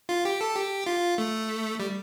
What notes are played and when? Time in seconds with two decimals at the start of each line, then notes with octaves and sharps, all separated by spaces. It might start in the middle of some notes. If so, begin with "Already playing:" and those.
0.09 F4
0.25 G4
0.41 A4
0.55 G4
0.87 F4
1.18 A3
1.80 G3